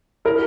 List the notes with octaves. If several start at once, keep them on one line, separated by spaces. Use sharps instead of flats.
E4 A#4